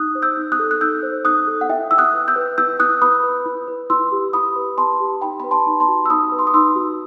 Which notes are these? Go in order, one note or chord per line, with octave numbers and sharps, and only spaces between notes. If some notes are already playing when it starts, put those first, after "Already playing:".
Already playing: D#4 D#6 F#6
C5
E6 G6
D#4
D#6 F#6
A4
F#6
D#4 E6 G6
C5
D#4 D#6 F#6
A4
F#5
E4 E5 G5
E4 E6
D#6 F#6
B4
E6 G6
B4
E4 E6 G6
E4 D#6 F#6
B4 B5 D#6
B4
E4
B4
E4 C6 E6
G4
E4 B5 D#6
B4
E4 A5 C6
G4
D#4 G5 B5
B4 B5
A5 C6
D#4
A5 C6
F#4
E6
D#4 B5 D#6
B4
C6
D#6
D#4 C6 E6
F#4